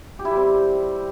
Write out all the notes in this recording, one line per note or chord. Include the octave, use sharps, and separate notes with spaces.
G4
E4
G3
C4